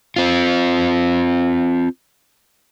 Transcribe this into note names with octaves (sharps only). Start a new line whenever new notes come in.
C4 F4